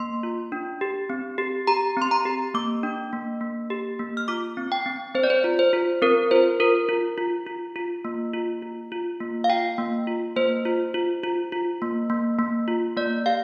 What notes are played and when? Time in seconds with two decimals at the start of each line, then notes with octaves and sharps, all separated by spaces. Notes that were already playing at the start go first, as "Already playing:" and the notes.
Already playing: A#3 C6
0.23 F4
0.52 D4
0.81 G4
1.10 C4
1.38 G4
1.67 G4 A#5
1.97 C4 C6
2.11 A#5
2.25 G4
2.54 A#3 D6
2.83 D4
3.13 A#3
3.41 A#3
3.70 G4
3.99 A#3
4.17 F6
4.28 F4 D6
4.57 C4
4.72 G5
4.86 C4
5.15 C4 C5
5.23 D5
5.30 C5
5.44 F4
5.59 C5
5.73 F4
6.02 C4 A#4
6.31 F4 C5
6.60 F4 A#4
6.89 F4
7.18 F4
7.47 F4
7.76 F4
8.05 A#3
8.33 F4
8.62 F4
8.92 F4
9.21 A#3
9.44 F5
9.50 F4 G5
9.78 A#3
10.07 F4
10.36 A#3 C5
10.65 F4
10.94 F4
11.24 F4
11.52 F4
11.82 A#3
12.10 A#3
12.39 A#3
12.68 F4
12.97 A#3 D5
13.26 G4 F5